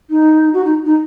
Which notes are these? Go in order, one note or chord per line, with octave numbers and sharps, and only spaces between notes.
D#4
F#4
D#4
D#4